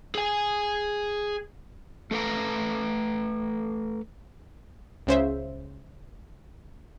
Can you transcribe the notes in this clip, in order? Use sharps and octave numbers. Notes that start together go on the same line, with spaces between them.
G#4 G#5
A3 A4 B4 F5 A#5
C#2 C#3 C5 E5